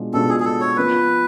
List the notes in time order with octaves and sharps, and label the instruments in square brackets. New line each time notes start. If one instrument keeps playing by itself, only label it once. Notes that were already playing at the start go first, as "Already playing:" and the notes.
Already playing: [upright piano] B2 G#3 D4 F4
[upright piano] B2 G#3 D4 F4 [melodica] A4
[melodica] G#4
G#4
A4
C#5
[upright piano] F3 B3 F4 [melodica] B4